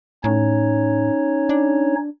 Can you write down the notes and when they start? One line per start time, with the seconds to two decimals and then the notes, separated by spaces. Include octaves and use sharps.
0.24 A2 C#4 D#4 C#5
1.49 D4